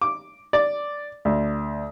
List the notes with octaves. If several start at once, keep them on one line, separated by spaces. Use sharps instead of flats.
D6
D5
D2